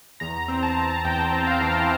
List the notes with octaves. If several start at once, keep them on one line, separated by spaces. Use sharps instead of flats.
E2 A#5
C4
A5
C4
E2 G5
C4
F5
E3